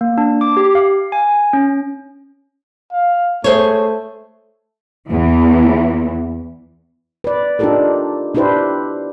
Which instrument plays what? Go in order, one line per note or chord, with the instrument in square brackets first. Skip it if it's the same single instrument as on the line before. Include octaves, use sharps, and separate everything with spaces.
[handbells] A#3
D4
D6
G4
F5
G#5
C#4
[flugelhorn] F5
[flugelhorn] A3 [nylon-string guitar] G#4 C5 C#5
[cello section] E2 E3
[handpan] B4 D5
D4 D#4 F4 G4 A4 A#4
D4 E4 G4 B4 C5